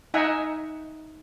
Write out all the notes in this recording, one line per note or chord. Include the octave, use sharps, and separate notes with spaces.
D#4 D#5 E5 F#5 G#5